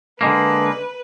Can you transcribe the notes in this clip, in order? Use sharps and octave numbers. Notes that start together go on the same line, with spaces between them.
D3 G#3 A#3 B4